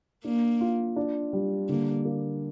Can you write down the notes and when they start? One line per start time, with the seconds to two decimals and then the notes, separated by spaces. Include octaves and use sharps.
0.24 A#3 D4
0.61 F4
0.96 D4
1.33 G3
1.69 D3 A#3
2.05 A#3